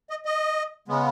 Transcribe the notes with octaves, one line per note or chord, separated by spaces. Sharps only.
D#5
D#5
C#3 G#3 B3